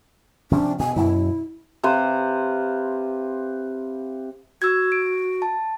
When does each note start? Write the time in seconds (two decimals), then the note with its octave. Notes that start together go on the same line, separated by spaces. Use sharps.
0.51 C3 F3 C#4 D4
0.79 B2 G#5
0.96 F#2 B2 E4
1.83 C3 B4 C5 F5
4.62 F#4 E6 G#6
4.92 D7
5.42 A5